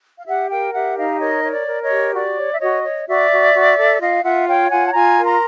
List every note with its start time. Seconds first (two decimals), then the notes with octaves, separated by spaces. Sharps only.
0.19 F5
0.27 G4 E5 F#5
0.51 A#4 F5 G5
0.74 G4 E5 F#5
0.98 D#4 D#5 F5
1.20 A#4 C#5 D#5
1.44 C#5
1.52 D5
1.67 A#4
1.83 C#5 D#5
1.91 G4
2.14 F#4 D5
2.37 C#5
2.53 E5
2.60 F#4 C#5 D#5
2.84 C#5
3.08 F#4 D5 E5
3.31 F#4
3.54 F#4
3.77 A4
4.01 F4 D#5 F5
4.24 F4 E5 F#5
4.47 C#5 F5 G5
4.70 F4 F#5 G#5
4.86 A5
4.94 F4 G#5 A#5
5.18 A#4
5.25 A#5 C6